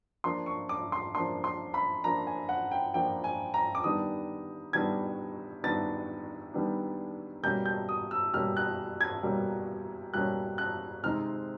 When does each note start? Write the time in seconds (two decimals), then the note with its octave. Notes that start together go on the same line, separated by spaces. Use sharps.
0.24 F3 A#3 D4 C6
0.46 C#6
0.69 D6
0.92 C6
1.15 F3 A#3 D4 C6
1.44 C6
1.74 B5
2.04 F3 A#3 D4 A#5
2.27 G#5
2.49 F#5
2.71 G5
2.94 F3 A#3 D4 G5
3.24 G#5
3.54 A#5
3.75 D6
3.84 D#3 G3 B3 D4 D#6
4.73 D#3 G3 B3 D4 G#6
5.64 D#3 G3 B3 D4 A6
6.54 D#3 G3 B3 D4
7.43 B2 G3 A#3 C#4 G6
7.65 G6
7.89 D#6
8.11 E6
8.33 B2 G3 A#3 C#4 F6
8.57 F#6
9.01 G#6
9.23 B2 G3 A#3 C#4
10.14 B2 G3 A#3 C#4 F#6
10.58 F#6
11.03 C3 D#3 G#3 C4 D#4 F6